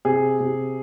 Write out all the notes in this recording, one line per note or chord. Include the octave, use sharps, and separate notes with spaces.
C3 G#4
C3